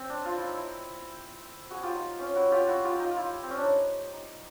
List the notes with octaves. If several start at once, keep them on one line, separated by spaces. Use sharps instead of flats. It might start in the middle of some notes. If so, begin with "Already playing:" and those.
Already playing: C4
D4
F4
E4
D#4
E4
F#4 G#4
F4 G4
D#4
C#4
E4 F#4
F4 G4
E4 F#4
F4 G4
D#4 F4
F4
E4
C4
C#4
D4
D#4
D#4